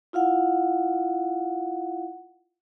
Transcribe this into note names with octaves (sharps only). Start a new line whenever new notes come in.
E4 F4 F5 F#5